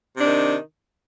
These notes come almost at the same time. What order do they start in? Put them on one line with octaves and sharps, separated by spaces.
C3 D4 D#3